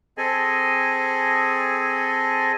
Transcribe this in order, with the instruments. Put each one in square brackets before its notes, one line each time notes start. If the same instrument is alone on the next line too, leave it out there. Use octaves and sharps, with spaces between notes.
[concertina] C4 G#4 A4 D#5 G#5